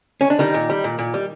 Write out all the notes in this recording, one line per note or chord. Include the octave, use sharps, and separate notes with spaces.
C#4
D4
D#3 G3 D#4
A#2
G3
A#2
A#2
G3